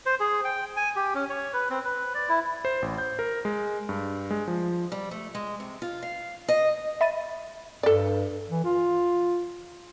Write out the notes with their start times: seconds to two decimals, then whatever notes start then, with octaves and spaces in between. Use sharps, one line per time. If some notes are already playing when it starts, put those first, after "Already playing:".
0.06 C5
0.20 G#4
0.44 G5
0.76 G#5
0.96 G4
1.15 C#4
1.29 C#5
1.53 B4
1.70 C4
1.84 B4
2.14 D5
2.29 E4
2.65 C5
2.82 A1
2.98 G6
3.19 A#4
3.45 G#3
3.89 G2
4.31 G#3
4.48 F3
4.92 G3
5.11 A3
5.35 G#3
5.60 C3
5.82 F4
6.02 F5
6.48 D#5
7.01 E5 B5 A6 D#7
7.83 G2 A4 D5
8.50 E3
8.65 F4